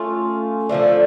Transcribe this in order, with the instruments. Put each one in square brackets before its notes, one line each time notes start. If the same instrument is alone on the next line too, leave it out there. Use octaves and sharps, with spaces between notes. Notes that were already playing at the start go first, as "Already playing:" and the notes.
Already playing: [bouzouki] A3 C#4 F4
D3 F3 A3 D4